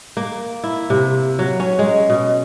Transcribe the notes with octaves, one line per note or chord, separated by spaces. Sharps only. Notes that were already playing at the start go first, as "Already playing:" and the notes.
A#3
E4
C3
F#3
C#4
G#3
B2